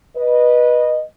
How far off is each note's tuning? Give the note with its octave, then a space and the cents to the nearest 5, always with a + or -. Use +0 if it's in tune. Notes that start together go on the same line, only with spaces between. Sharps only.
B4 -20 D#5 -15